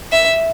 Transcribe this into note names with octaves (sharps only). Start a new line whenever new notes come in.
E5